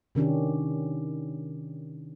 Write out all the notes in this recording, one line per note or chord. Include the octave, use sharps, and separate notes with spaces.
C3 D#3 C#4 D4 G4